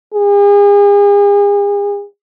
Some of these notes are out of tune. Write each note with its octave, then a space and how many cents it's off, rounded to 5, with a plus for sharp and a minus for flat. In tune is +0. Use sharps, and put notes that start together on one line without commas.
G#4 -40